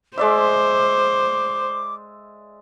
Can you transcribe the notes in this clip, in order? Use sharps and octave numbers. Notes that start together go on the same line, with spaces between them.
G#3 C5 D5 E5 D6